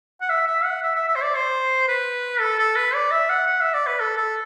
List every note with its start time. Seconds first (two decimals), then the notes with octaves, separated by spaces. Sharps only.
0.21 F#5
0.30 E5
0.47 E5
0.64 F#5
0.83 E5
0.95 E5
1.08 E5
1.15 C5
1.22 D5
1.35 C5
1.88 B4
2.41 A4
2.59 A4
2.76 B4
2.94 D5
3.11 E5
3.29 F#5
3.47 F#5
3.61 E5
3.74 D5
3.87 B4
4.00 A4
4.17 A4